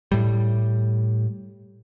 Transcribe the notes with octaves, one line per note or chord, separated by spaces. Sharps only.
A2 G3